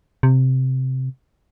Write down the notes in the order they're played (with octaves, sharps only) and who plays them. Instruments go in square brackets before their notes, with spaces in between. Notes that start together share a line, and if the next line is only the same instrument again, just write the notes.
[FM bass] C3